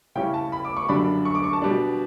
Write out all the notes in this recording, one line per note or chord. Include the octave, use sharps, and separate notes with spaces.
C#3 G3 C#4 E4 G5
A5
B5
D6
C#6
F#2 D3 G3 D4 B5
C#6
D6
C#6
A5
B2 G3 D4